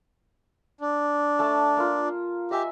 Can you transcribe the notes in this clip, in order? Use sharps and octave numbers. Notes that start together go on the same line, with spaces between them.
D4
A3 A5
A#3 F4
G4 D#5 E5 G#5